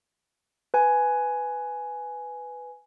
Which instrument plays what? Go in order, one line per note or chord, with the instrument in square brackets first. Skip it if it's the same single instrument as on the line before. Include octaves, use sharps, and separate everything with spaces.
[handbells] B4 G#5